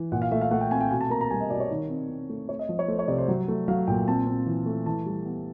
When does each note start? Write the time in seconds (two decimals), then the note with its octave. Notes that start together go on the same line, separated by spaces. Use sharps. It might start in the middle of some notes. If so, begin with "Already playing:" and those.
Already playing: E3
0.12 A#2 F#5
0.22 F5
0.31 A3 E5
0.41 F5
0.51 A3 F#5
0.61 G5
0.71 C4 G#5
0.81 G5
0.91 B2 G#5
1.01 A5
1.10 A#3 A#5
1.21 A#5
1.31 G3 G#5
1.40 D#5
1.50 B2 D5
1.60 C#5
1.71 D#3
1.90 C4
2.09 C4
2.29 A3
2.49 A3 C#5
2.59 D#5
2.69 F3
2.79 C#5
2.88 A3 C5
2.99 C#5
3.08 C3 D5
3.18 C5
3.28 F#3
3.48 A3
3.68 F#3 F5
3.87 A#2 G5
4.07 C4 A5
4.27 C4
4.46 E3
4.66 A3
4.86 E3 A5
5.06 G3
5.25 B3